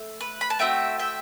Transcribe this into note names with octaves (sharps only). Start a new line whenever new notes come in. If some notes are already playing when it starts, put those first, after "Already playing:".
Already playing: A3
B4
B5
A5
A3 C4 F#4 E5 G5
E5 G5